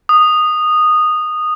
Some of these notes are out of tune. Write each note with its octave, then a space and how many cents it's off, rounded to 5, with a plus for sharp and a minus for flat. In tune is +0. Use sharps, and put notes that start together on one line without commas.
D#6 -15